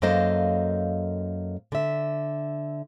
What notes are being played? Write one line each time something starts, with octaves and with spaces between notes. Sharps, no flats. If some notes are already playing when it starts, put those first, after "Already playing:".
F#2 A#3 A4 C5 D#5 F5
D3 E5